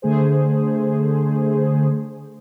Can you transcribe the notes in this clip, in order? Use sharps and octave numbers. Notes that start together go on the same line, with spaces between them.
D3 A3 G#4 C5